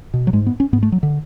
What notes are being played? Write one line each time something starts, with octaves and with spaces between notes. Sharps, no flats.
B2
F#3
G#2 G#3
B3
C#4
G#2 B3
A3
F#3
D3